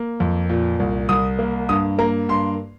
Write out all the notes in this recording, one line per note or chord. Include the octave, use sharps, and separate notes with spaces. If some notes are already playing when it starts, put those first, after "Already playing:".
Already playing: A#3
F2
A#2
C2
C2 D#6
A#3
G2 D#6
A#3 A#5
G2 C6